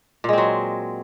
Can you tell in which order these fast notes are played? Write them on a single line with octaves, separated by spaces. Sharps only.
A#2 G#3 C4 F#3